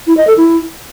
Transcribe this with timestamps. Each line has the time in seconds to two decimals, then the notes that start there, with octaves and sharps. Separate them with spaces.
0.07 E4
0.17 D#5
0.27 A4
0.37 E4